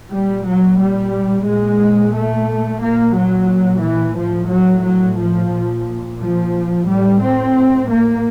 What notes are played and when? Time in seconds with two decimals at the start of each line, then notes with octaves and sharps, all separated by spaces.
0.13 A#2 G3
0.47 F#3
0.81 G3
1.48 A#2 G#3
2.15 A3
2.82 A#2 A#3
3.16 F#3
3.83 E3
4.17 A2 F3
4.51 F#3
4.84 F#3
5.18 F3
5.51 A#2
6.20 F3
6.86 A2 G3
7.20 C4
7.88 A#3